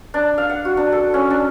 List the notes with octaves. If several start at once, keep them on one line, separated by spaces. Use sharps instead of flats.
D4
F5
F#5
F#4
D4
A4
C#4
D4